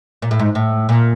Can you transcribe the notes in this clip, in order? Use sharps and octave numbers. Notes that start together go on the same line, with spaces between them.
A#2
A2
G#2
A2
A#2